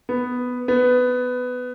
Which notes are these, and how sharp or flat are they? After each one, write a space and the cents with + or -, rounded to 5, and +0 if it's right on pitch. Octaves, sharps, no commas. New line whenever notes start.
B3 +5
B3 +15